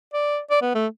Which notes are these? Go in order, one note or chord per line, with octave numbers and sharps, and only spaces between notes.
D5
D5
B3
A3